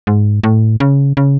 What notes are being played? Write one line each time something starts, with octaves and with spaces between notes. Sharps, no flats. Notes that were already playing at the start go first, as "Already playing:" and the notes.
G#2
A2
C#3
C#3